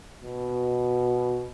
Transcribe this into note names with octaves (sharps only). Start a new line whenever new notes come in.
B2